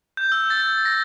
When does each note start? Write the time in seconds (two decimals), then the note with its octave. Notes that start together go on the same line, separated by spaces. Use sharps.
0.17 G6
0.32 E6
0.50 A6
0.85 A#6